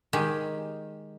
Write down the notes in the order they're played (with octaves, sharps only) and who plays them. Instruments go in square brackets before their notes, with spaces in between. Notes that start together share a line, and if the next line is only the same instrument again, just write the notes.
[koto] D#3 G#3 G4